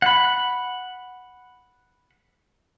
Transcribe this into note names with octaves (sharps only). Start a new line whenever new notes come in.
F#5 B5